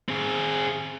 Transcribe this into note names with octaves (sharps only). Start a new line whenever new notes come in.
C4 G#4